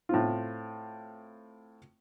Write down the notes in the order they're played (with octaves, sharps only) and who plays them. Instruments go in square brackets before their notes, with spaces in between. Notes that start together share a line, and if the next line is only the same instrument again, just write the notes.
[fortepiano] A2 C4 F4